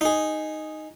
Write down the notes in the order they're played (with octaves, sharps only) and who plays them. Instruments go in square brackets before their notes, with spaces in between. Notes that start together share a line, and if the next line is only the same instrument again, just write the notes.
[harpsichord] D#4 G#4